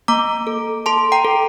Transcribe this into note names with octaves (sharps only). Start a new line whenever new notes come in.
A#3 A#5 D6
A4
A4 A5 C6
G5 A#5
A4